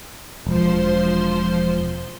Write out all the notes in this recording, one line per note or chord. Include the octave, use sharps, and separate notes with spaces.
E1 F3 C5 C6